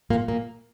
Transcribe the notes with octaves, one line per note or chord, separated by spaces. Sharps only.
A#2 A#3
A#2 A#3